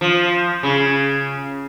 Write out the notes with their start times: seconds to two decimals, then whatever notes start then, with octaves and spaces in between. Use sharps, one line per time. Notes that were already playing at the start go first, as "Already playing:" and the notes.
0.01 F3
0.63 C#3